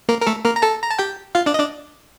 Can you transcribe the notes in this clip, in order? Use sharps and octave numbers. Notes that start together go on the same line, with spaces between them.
A#3 A#4
A#4
A3 A4
A#3 A#4
A#5
A4 A5
A#5
A5
G4 G5
F4 F5
D4 D5
D#5
D4 D5